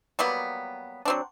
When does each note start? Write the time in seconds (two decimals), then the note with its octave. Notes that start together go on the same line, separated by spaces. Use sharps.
0.19 F#3 G3 A#3 B3
1.05 F#3 C4 D4